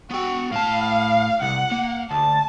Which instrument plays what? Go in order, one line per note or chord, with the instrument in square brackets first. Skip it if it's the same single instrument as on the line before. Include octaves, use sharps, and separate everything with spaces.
[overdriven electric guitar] B3 G5 [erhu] F#4
[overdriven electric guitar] A2 A5 [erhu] F5
[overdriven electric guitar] C2 [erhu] F#5
[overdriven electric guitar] A#3
[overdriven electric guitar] D2 [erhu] A5